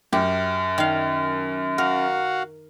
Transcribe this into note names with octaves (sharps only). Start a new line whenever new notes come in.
F#2 G4
D#3 F5
F#4 A#4 F5 F#5